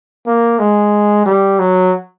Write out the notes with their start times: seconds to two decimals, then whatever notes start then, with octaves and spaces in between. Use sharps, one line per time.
0.27 A#3
0.59 G#3
1.26 G3
1.59 F#3